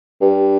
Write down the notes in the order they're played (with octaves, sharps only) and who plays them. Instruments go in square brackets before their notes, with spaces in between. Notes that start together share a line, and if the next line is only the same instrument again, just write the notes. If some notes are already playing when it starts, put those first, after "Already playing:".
[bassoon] G2